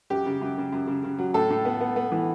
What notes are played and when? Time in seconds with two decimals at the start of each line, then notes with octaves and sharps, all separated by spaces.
0.10 F#2 G4
0.26 C#3
0.41 F#2
0.58 C#3
0.72 F#2
0.87 C#3
1.04 C#3
1.19 F#3
1.34 A2 A4
1.50 A2
1.65 B3
1.80 B3
1.96 B3
2.12 E3